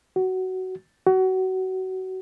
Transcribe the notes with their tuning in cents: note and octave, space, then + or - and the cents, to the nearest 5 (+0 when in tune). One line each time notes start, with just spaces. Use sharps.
F#4 +15
F#4 +25